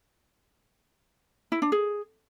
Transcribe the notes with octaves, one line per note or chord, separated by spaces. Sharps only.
E4
D4
G#4